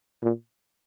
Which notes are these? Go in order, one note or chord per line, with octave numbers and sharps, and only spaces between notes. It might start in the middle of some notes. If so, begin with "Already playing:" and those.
A#2